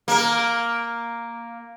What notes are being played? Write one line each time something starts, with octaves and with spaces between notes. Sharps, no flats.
A#3 A#4